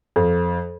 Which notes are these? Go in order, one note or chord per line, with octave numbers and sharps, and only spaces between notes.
F2